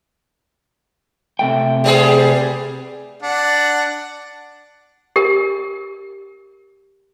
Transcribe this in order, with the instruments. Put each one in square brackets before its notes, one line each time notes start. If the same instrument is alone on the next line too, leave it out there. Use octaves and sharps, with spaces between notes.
[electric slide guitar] C3 A3 G5
[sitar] G3 B3 G#4
[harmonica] D4 F#5
[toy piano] G4 A#4